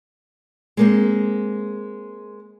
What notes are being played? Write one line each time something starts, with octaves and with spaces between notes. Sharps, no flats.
G#3 A#3 C4